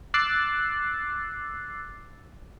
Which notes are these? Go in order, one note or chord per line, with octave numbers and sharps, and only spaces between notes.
D6 E6 F#6 A6 C7